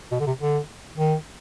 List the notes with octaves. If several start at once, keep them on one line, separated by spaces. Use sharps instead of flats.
B2
D3
C3
D3
D#3